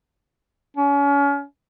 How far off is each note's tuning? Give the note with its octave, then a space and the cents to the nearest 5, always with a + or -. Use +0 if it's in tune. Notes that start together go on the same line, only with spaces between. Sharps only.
C#4 +35